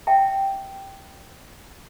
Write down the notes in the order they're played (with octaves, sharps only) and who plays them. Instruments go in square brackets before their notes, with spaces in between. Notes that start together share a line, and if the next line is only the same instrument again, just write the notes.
[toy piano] E5 G5 A5